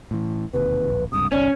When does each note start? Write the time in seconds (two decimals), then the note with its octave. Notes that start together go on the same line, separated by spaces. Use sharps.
0.11 A2 E3
0.54 E1 D#2 C3 B4
0.89 D1 A#1
1.12 C#2 G2 C3 D#6
1.32 G1 C2 C#4 D5